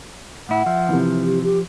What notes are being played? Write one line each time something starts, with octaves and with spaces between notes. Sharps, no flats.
A2 E4 F#5
F3 E5
C3 E3
G4
G4